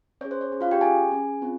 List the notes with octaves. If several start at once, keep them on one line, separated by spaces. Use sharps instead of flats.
C#4 G#4 C#5
C5
C#5
C#4 G#4
F4 F5
G4 G5
C#4 G#4 G#5
C#4 G#4
C4 F4